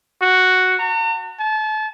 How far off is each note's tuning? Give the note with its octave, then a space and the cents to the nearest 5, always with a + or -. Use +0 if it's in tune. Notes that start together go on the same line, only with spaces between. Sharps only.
F#4 +0
A#5 -45
A5 -30